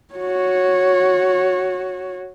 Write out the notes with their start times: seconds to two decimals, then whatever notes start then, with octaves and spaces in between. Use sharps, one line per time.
0.14 F#4 C#5